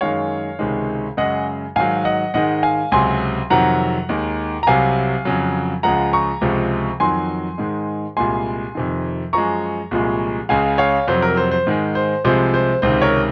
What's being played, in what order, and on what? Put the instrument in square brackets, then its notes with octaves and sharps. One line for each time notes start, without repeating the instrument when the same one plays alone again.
[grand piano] F#2 D#3 G#3 C#5 F5
C#2 C3 D#3 G#3
F#2 C#3 G#3 D#5 F#5
G#2 D#3 F#3 F5 G#5
D#5 F#5
G#2 D#3 G#3 D#5 F#5
F5 G#5
C#2 C3 F#3 G#5 C6
F2 C3 D#3 F#3 F#5 A#5
D#2 D#3 G#3
A#5
C2 C3 F#3 F5 G#5
F2 C#3 F#3
C#2 C#3 F3 G#3 F#5 A#5
A#5 C#6
C#2 C3 F3 G#3
F2 D#3 F#3 G#5 C6
G#2 D#3 G#3
C2 A#2 G#3 G#5 C6
F2 C3 D#3
F#2 F3 G#3 A#5 C#6
C2 A#2 F3 G#3
C#2 C#3 G#3 F5 G#5
C#5 F5
F2 C3 F#3 C5
A#4
C5
C5
G#2 D#3 G#3
C5
C2 C3 F3 G#3 C5
C5
C#2 C3 D#3 C5
A#4 C#5